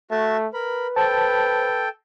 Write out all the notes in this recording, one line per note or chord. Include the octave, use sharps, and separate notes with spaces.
A3 F#4 E5 A5
A#4 B4 B5
A4 C5 G5 A5